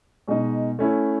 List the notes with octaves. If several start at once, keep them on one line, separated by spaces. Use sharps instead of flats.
B2 G#3 D#4
A3 C#4 E4